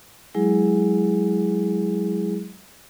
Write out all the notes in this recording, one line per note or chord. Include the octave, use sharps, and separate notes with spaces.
F#3 G#3 E4 G#4